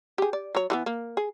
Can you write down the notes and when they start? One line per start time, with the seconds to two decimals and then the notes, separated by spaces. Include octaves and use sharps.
0.18 G4 G#4
0.33 D5
0.55 F#3 C#5
0.70 E3 A3 B3
0.86 A#3
1.17 G#4